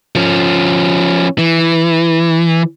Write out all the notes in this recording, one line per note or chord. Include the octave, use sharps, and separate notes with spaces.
F3 C#4
E3